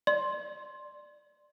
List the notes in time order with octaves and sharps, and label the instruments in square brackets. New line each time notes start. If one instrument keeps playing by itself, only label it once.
[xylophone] D5 C6